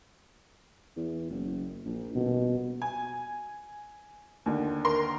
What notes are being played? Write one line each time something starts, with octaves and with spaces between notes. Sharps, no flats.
E2
F#1
A#1
D#1 B2
G#5
D#2 D3
A#4 C6